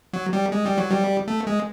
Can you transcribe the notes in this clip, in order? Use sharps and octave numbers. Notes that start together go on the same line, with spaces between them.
F#3
G3
G#3
G3
F#3
G3
A3
G#3